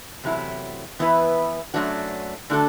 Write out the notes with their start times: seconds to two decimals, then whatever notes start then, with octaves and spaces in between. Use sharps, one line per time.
0.24 E2 C3 F#3 A3 E4
0.99 E3 B3 E4 B4
1.74 F#2 F#3 A3 D4 F#4
2.50 D3 A3 D4 F#4 A4